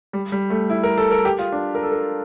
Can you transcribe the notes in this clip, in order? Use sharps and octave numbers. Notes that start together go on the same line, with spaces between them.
G3
G3
A3
E4
A#4
A4
A#4
G4
F4
D4
A#4
A4
A#4